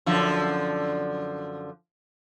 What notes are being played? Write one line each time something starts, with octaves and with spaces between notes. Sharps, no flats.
F#2 D3 F3